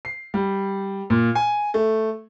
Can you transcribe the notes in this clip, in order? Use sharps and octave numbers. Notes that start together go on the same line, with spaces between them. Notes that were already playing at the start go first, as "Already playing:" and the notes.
C7
G3
A#2
G#5
A3